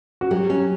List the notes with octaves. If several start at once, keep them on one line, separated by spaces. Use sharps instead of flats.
F#4
F#3 G4
C#4